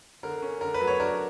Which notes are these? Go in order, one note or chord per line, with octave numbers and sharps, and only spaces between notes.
D3 A#4
C#4
D3 A#4
B4
F#3
C#5
D4 A#4